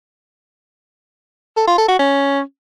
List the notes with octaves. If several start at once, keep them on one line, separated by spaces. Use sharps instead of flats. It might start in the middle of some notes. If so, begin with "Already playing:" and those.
A4
F4
A4
F#4
C#4